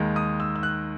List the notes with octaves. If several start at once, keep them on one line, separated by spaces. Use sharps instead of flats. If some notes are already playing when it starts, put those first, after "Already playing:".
Already playing: D#2 D#3 G#3
D#6
E6
E6
F#6